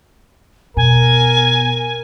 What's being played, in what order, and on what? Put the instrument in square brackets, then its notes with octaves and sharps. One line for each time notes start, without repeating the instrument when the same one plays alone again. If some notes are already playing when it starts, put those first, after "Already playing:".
[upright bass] B2 [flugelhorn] A#4 [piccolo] G#5